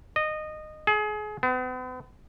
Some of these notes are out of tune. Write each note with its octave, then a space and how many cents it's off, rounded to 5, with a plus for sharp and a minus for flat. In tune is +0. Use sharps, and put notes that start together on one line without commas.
D#5 -15
G#4 +30
B3 +45